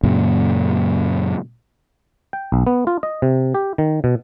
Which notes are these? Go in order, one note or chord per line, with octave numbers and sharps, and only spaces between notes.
F#2 A#2 C#3
G5
B1
B3
F4
D#5
C3
G4
D#3
B2